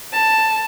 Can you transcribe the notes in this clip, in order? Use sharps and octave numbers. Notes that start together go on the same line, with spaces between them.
A5